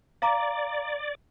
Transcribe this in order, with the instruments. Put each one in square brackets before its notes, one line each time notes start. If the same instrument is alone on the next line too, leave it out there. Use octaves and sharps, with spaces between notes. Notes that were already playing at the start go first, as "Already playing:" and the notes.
[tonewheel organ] D5 [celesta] F5 A#5 D6